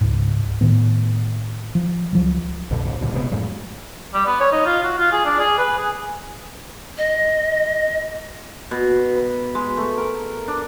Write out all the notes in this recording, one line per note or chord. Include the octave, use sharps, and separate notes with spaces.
C#2 G#2
A2 D#3 B3
F3
C#2 F3 F#3
B1 F2 B2 D3
C#2 G#2
D2 G2 A#2 D3
E1 C3 G#3 B3
F#2 A2 F3 G#3
G3
B3
C#5
D#4
F4
F#4
F4
G#4
D4
G#4
B4
G#4
D#5
B2
B4
G#3
A3
A#4
D4